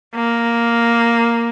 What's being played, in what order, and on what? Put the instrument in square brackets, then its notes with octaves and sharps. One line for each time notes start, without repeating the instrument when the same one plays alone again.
[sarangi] A#3